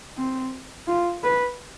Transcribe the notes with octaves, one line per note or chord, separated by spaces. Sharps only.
C4
F4
B4